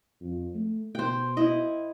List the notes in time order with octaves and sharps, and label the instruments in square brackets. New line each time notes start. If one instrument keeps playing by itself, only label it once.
[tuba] F2
A3
[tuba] B2 [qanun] C5 G5
[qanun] E4 D#5